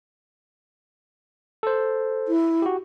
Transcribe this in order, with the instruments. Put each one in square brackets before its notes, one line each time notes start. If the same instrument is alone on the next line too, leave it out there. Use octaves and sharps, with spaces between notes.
[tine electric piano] A4 C5
[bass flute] E4
[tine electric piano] F#4 G4